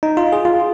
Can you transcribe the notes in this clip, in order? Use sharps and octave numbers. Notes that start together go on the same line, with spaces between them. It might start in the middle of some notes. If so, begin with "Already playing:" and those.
D#4
F4
G#4
F4